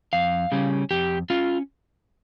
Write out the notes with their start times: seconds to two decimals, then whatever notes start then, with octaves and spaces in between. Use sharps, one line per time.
0.13 F2 F5
0.52 C#3 G3 C#4
0.91 F2 G4
1.30 C#4 F4